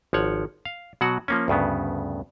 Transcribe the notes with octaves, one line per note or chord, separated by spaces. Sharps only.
G#1 F3 C#5 F#5
F5
B2 F#3 F#4 F#5
F3 A#3 C#4
D2 G2 C#3 B3